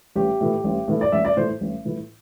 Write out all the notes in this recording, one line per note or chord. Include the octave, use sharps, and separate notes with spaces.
A1 G4
A2 E3
A1
A2 E3
D5
A1 E5
D5
A2 E3 C5
A1
A2 E3